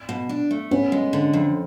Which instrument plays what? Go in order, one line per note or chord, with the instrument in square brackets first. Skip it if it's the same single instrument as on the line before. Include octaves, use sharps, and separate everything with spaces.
[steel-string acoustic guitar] B2
D4
A3
[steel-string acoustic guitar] B3 [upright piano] C#4
[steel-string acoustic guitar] G#3
D3
F2